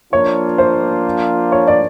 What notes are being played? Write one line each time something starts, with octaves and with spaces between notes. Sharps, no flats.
F3 A#3 D4 F4 C#5
C5
C#5
D5